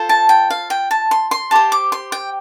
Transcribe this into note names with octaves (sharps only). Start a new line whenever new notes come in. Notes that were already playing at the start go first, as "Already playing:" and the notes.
Already playing: F4 A4 C5
A5
G5
F5
G5
A5
C6
C6
G4 C5 A5
D6
C6
G5